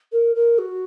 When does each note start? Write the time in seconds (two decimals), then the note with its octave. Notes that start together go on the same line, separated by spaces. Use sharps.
0.12 A#4
0.35 A#4
0.58 F#4